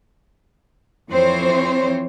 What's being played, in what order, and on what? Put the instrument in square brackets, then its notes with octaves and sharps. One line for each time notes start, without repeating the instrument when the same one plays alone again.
[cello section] F2 E3 C4 C5 C#5